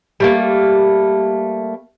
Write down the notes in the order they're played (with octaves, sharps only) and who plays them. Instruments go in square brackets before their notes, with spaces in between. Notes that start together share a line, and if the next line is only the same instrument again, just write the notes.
[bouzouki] G3 A3 A#3